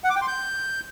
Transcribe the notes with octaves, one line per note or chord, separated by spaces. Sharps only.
F#5
D6
G5
C6
G6